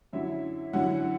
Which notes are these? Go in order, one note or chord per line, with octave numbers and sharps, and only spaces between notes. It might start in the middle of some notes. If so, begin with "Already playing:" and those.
F#2 D3 F#3 C#4 E4 E5
F#2 D3 F#3 C#4 E4 F#5